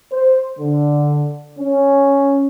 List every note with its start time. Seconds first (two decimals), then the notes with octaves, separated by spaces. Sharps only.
0.12 C5
0.59 D3
1.59 C#4